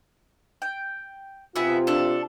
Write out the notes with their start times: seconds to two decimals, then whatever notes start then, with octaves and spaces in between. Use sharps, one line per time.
0.62 G5
1.56 C3 B3 F4 G#4 E5
1.87 D4 A4